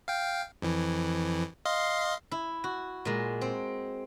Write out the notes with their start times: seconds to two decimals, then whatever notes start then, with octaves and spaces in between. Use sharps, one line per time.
0.08 F5 G5
0.62 F2 E3
1.65 D#5 F5 C6
2.32 E4
2.64 F#4
3.05 A#2 G#3
3.41 C4